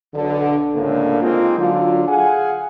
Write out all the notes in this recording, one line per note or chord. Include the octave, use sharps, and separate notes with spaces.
B1 D3
C#2 A2 D3 A#3
G#3 A#3 C4 D#4 F4
D3 F#3 F4
G#4 F5 F#5 G#5